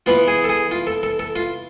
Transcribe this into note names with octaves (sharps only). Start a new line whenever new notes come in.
E3 B3 F4
G#4
A4
G#4
F4
A4
A4
A4
F4